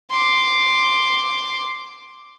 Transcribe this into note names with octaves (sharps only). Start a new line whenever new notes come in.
C6 D6